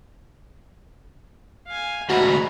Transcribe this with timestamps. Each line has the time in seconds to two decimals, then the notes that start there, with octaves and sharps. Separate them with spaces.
1.68 F5 G#5
2.10 D2 G#2 F#4 A#5 B5